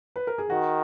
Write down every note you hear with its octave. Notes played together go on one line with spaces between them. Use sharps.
B4
A#4
G#4
D#3 F#4